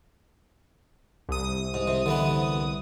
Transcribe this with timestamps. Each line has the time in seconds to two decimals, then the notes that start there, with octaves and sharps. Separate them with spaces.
1.29 C2 D#6
1.74 G#2
1.88 C3
2.06 D3 E3 B3